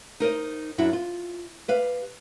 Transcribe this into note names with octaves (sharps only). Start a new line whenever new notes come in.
D#4 A#4 C5 D#5
F#2 D4 E4 F#4
F4
G4 B4 F5